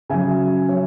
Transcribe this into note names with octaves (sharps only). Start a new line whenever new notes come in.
C#3 F#3 E5 G#5
F#3 C#5 E5